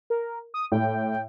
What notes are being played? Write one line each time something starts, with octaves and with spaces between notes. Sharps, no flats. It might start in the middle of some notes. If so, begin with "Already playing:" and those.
A#4
D#6
A2 G5